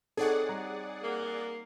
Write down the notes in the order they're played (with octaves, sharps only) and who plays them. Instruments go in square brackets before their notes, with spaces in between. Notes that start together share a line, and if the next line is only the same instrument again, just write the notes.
[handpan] C4 D#4 C#5 [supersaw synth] G#4 D5 F#5 [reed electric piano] A4
[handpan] G3 [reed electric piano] A#5
[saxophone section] A#3